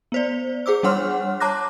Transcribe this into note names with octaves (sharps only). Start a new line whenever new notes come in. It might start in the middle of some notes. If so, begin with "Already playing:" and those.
B3 C5 D5
G#4 C5 D6 E6
G3 D4 C#5 F#5 C6 F6
C#5 A5 A#5 D6 F#6 A#6